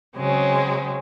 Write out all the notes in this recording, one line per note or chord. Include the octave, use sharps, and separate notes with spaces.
C#3 F#3 G#3 C4